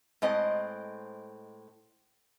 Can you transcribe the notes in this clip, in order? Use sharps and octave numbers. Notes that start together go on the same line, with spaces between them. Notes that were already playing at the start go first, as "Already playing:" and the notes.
A2 G#3 C4 D#5